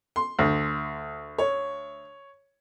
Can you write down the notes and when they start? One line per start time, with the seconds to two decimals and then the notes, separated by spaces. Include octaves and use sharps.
0.16 C6
0.39 D2
1.38 C#5